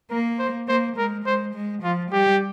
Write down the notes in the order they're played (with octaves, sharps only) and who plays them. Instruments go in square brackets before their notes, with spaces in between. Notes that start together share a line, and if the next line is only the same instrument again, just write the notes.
[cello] A#3 [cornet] A#4
[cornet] C5
[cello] A#3 [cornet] C5
[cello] G#3 [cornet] A#4
[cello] G#3 [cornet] C5
[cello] G#3
[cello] F3 [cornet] F4
[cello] G3 [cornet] G4